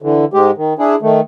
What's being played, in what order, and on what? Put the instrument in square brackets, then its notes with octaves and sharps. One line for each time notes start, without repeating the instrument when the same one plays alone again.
[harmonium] D3 E3
G#2 G#3 G4
D#3
D4 E4 G#4
D#3 A3